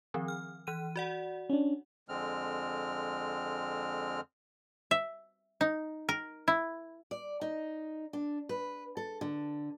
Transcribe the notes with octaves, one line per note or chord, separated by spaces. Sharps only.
D#3 F3 C4
F6
E3 F#6 D#7
F#4 D5 F#5
C#4 D4
F2 D3 G#3 C4 F6
E5
D#4
A#4
E4
D5
D#4
D4
B4
A4
D3